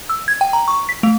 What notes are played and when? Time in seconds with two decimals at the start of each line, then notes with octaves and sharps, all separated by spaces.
0.09 E6
0.28 G#6
0.41 G5
0.53 A#5
0.68 C#6
0.89 B6
1.03 A3